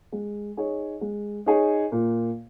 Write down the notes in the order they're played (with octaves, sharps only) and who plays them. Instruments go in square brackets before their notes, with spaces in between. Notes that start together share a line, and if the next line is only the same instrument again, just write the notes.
[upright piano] G#3
D#4 G#4 C#5
G#3
D#4 G#4 C#5
A#2